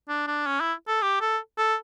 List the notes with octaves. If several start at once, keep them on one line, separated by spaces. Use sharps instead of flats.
D4
D4
C#4
E4
A4
G4
A4
A4